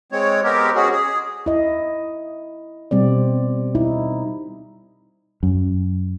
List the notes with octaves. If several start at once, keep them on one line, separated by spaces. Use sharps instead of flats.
G#3 C4 C#5
G#3 B3 C4 G4 A#4
G#3 C#4 F#4 G#4
G#4
E4 D#5
B2 G3 C4 D5
D#4 E4
F#2